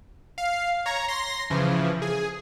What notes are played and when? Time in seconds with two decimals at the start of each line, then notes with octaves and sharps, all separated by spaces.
0.38 F5
0.86 C#5 A#5
1.08 C6 A#6
1.50 C#3 E3 F3
2.02 G#4